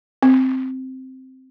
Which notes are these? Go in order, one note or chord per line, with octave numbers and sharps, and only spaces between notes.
C4